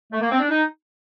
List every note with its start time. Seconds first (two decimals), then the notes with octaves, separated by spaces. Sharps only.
0.13 A3
0.21 A#3
0.31 C4
0.40 D4
0.50 D#4